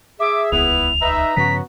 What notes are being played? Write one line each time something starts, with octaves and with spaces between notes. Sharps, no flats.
G#4 E5 D6
D#1 C#2 B3 E4 F7
D#4 B4 E5 A#5
G2 C#3 F3 B3 C#4 F#4 B6